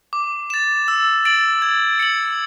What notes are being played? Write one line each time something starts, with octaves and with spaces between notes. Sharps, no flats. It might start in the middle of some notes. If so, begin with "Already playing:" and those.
D6
A6 E7
E6
A6 D7 F#7
G#6
C#7 F#7